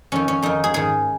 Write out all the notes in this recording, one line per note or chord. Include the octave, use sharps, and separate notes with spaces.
F2 D#3 C#4
C#4
F2 D#3 D#4
G#4
G#2 D#3 G#4